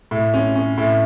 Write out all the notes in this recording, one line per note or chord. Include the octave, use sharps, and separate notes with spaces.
A2
C#4
C#4
A2